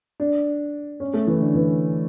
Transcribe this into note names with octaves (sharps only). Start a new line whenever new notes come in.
D4
C#4
A3
E3
D3
E3